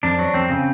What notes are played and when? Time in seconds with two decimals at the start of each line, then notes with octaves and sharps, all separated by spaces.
0.03 F2 D4
0.19 F#3
0.34 F2 C4
0.50 C#3